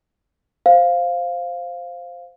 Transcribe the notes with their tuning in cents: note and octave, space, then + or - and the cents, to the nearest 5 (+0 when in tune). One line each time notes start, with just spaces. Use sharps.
C5 +0 F5 +0